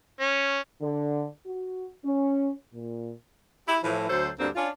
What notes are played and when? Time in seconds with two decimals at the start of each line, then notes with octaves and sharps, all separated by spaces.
0.21 C#4
0.81 D3
1.46 F#4
2.04 C#4
2.74 A#2
3.67 E4 G4
3.83 A2 E3 F3
4.09 D2 F#3 A3 A4 C5
4.39 D2 G2 D3 A#3 C4 D4
4.56 C#4 D4 F4